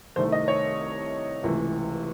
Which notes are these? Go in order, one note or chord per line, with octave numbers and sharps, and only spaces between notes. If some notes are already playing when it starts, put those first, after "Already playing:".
C2 C3 D#3 A3 C5
D#5
C#5
C#2 C3 E3 A3